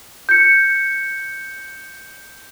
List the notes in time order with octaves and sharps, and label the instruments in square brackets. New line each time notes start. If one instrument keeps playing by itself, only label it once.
[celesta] G6 C#7